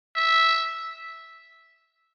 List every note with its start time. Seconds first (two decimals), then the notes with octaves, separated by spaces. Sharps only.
0.16 E5